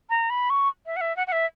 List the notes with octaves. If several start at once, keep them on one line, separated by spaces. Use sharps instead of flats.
A#5
B5
C#6
E5
F#5
E5
F#5
F#5
E5